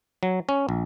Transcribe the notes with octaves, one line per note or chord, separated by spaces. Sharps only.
F#3
C#4
A#1